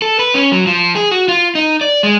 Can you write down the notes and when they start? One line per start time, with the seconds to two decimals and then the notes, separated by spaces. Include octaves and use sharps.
0.02 A4
0.19 B4
0.34 C#4
0.52 F#3
0.67 F3
0.96 G#4
1.11 F#4
1.28 F4
1.55 D#4
1.81 D5
2.03 G#3